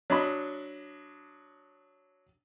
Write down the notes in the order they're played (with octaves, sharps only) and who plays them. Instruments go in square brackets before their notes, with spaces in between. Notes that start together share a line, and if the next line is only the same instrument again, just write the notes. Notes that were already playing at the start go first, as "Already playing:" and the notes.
[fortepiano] F#3 D4 D#5 B5